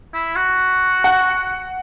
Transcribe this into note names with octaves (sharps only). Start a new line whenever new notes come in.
E4
F#4
F#5